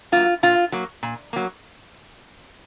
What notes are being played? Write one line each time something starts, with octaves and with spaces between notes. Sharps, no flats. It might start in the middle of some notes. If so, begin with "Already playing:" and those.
F#3 A#3 F4
A#2 F4
F#3 A#3
A#2
F#3 A#3